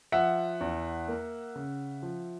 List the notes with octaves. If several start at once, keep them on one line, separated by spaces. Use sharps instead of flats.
F3 E5 F#5
E2
A#3
C#3
F3